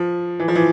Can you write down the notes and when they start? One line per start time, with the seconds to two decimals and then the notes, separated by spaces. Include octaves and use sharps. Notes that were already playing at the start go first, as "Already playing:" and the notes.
Already playing: F3
0.39 E3
0.48 F3
0.55 E3